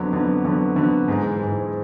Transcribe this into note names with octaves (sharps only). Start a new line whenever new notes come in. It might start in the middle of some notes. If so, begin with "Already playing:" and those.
Already playing: F2 D3 F#3 B3
F2 D3 F#3 B3
F2 D3 F#3 B3
F2 D3 F#3 B3
G#2 E3 G#3
G#2 E3 G#3